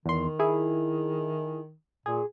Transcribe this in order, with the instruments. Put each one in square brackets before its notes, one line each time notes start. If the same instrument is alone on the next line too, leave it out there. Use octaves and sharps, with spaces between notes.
[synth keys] E2 C6 [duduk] D#3
[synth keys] E4 G#4
[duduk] A#2 [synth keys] G#4